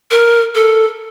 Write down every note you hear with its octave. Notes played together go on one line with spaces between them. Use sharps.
A#4
A4